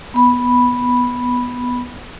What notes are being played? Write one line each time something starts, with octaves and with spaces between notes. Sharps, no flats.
B3 B5